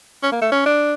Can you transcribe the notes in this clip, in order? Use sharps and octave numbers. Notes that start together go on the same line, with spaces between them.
C#4
A#3
A3
C#4
D4